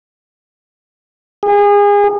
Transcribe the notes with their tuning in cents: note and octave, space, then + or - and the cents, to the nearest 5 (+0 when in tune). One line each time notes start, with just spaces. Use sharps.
G#4 -30